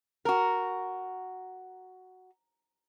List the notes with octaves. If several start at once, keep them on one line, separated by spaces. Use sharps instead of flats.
F#4 A#4 A#5